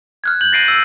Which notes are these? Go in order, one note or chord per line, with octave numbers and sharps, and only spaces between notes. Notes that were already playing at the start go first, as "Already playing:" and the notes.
F6 F#6 G#6
G6 F#7
A6 A#6 C7 D7 D#7
E6